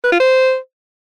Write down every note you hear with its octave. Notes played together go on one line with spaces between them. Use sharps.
B4
F4
C5